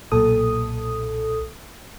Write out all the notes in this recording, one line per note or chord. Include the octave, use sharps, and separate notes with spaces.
B1 A#2 A4 D#6